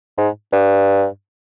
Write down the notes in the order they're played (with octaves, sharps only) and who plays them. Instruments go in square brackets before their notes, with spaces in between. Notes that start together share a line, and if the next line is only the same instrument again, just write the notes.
[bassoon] G#2
G2